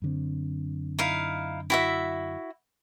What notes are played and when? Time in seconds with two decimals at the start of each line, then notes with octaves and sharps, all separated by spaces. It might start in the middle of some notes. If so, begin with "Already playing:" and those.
0.02 F#2 D3 C4
0.99 D#4 E4 F5
1.70 E4 F#4 E5